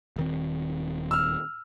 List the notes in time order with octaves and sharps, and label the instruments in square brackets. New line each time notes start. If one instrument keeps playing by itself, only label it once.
[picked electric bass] D#1 D#3 C4
[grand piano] E6 F6